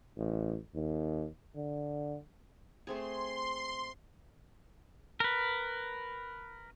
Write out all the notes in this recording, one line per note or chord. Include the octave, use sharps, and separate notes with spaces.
A1
D#2
D3
A3 C4 G#4 C6
A#4 B4